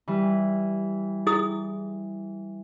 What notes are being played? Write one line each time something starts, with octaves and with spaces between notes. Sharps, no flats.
E3 G3
E4 G#4 D#6